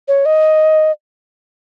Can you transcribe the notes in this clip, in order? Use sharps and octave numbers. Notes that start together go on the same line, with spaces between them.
C#5
D#5